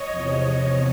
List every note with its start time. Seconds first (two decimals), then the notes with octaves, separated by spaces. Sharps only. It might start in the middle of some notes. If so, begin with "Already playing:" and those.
Already playing: C#5 D#5
0.12 E2 C3 F3